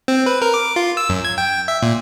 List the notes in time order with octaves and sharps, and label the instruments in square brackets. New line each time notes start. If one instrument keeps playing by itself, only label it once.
[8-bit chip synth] C4
B4
A#4
D6
F4
E6
F#2
G#6
G5
E5
A#2